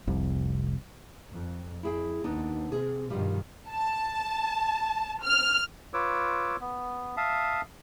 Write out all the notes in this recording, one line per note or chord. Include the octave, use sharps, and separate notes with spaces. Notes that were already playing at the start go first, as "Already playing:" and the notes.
F1 C2
F2
F2 E4 G#4 G5
D#2 B3 D4 D#4
C3 G#4
G2 B2 D#3 F3 G3
A5
F6
F4 B4 C#5 D6 E6
B3
E5 F5 A5 D#6